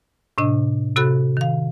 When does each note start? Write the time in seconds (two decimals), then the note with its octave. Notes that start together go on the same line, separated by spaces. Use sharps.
0.38 A2 C3 D4 D#5
0.96 C3 F#4 A4 B5 F#6
1.37 D#3 F5